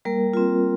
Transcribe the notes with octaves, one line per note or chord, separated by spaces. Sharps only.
G3 A#3 A#4
C4 F4